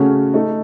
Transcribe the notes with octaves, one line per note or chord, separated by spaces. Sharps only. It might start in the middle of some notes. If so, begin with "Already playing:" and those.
Already playing: C#3 A3 C#4 F#4
A3 D#4 A4